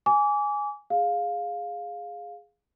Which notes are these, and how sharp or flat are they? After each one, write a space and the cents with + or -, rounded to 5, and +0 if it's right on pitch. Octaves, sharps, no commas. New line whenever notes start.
G#5 +0 D6 -30
G#4 +0 F5 +10